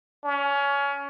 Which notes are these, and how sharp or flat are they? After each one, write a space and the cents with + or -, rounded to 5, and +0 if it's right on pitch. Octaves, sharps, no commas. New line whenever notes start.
C#4 +25